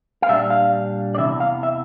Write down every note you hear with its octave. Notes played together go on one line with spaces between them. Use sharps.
F5
A#2 G3 D4 E5
F5
D5
E2 C3 E3 E5
F5
E5